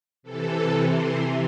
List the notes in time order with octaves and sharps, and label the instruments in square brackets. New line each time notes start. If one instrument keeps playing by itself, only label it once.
[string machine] C3 E3 A4
C5